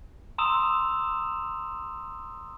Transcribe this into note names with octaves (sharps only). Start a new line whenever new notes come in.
A#5 C6 D#6 E6 E7 F7